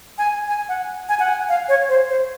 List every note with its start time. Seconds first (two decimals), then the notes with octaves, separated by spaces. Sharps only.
0.18 G#5
0.48 G#5
0.69 F#5
1.09 G#5
1.19 F#5
1.29 G#5
1.49 F5
1.69 C#5
1.89 C5
2.10 C5